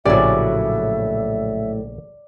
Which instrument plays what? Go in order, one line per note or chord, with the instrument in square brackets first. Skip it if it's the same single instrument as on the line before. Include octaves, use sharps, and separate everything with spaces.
[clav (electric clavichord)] A#1 C#3 G4 [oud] A2 F#3 C#4 [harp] D5 [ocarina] E5